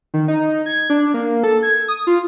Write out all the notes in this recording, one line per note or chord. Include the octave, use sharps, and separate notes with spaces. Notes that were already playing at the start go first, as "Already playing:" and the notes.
D#3
D#4
G#6
D4
A#3
A4
G#6
D#6
F4